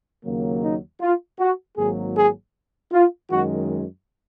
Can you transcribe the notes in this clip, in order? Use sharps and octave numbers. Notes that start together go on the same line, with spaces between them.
D#2 C#3 F#3 A#3
D#4
F4
F#4
G#1 G#2 F#3 A#3 G#4
G#4
F4
F#2 D#3 G#3 F#4